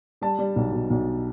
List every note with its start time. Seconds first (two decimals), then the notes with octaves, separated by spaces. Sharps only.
0.21 G3 A5
0.39 G3
0.56 B1
0.72 B2
0.90 B1